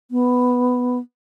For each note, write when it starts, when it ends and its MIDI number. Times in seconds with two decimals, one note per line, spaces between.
0.11 0.98 59